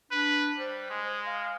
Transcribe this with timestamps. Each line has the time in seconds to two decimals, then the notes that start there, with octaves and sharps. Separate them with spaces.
0.12 D4 B4
0.58 G3 C5
0.90 G#3
1.27 F5